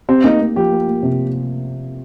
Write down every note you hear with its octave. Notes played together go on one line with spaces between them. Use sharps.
C4 G4
A#3 D#4
A#3
F3 G4
A#3
A#3
C3